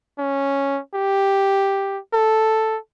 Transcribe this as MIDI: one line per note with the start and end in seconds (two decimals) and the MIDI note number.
0.19 0.80 61
0.95 1.99 67
2.14 2.78 69